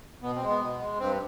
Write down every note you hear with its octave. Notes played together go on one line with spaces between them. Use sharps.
B2 B3
C4
G#3
B3
B2
G#3
G2 C4